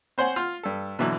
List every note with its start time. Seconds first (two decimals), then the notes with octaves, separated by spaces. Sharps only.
0.18 C4 C5 C#5 F#5 G#5
0.36 F4 F6
0.63 G2 A4
0.99 B2 D3 E3 F#3